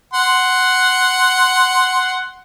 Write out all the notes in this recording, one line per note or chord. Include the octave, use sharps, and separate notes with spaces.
F#5 C6